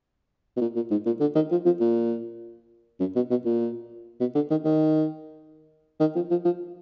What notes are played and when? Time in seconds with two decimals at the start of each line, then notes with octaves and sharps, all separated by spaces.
0.57 B2
0.61 A#2
0.76 A#2
0.91 G#2
1.06 A#2
1.21 D3
1.35 D#3
1.51 F3
1.66 F3
1.80 A#2
3.00 F#2
3.16 B2
3.30 B2
3.45 A#2
4.20 B2
4.35 D3
4.50 D#3
4.65 D#3
6.00 D#3
6.16 F3
6.31 F3
6.45 F3